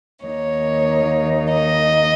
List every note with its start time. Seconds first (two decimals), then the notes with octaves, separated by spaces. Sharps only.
0.25 D#2 D#3 A#3 D#4 C#5
1.53 D#5